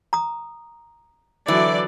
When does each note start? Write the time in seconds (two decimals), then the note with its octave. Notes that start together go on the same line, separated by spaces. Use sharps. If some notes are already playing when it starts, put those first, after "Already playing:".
0.13 A#5 D#6
1.48 D3 E3 F#3 D5